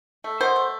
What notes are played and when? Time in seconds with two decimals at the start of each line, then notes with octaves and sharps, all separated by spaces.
0.24 A3
0.41 B2 C5
0.56 A3